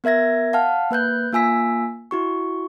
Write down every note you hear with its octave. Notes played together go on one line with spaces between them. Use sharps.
B3 A#4 E5 G#6 A#6
F5 F#5 A5 F6
A#3 B4 F#6 G6
A#3 F4 G#5 E6 B6
E4 F#4 C#6